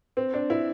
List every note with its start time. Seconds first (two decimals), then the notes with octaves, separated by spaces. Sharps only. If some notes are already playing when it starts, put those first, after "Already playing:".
0.17 C4
0.34 D4
0.50 E4